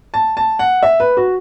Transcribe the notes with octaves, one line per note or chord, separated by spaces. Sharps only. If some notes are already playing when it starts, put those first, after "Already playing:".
A5
A5
F#5
E5
B4
F#4